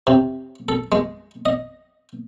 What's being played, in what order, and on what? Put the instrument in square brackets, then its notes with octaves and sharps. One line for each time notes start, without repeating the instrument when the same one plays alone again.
[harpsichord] C3
A4
G#3
D#5